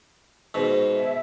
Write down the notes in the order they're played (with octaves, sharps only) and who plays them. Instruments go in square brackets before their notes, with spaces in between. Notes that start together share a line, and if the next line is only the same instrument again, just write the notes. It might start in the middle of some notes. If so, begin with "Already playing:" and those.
[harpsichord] G#2 B2
[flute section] E5